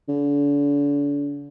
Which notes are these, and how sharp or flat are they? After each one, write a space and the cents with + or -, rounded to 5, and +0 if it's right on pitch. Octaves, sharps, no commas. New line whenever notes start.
D3 -40